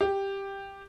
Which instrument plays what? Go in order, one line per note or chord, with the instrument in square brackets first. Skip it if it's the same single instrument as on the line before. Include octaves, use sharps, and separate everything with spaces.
[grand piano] G4